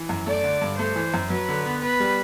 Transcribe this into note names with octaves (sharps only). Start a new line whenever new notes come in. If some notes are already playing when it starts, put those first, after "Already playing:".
Already playing: E3
F#2
A3 D5
D3
G2
A3 C5
E3
F#2
F#3 B4
D3
B3
B3 B4
G3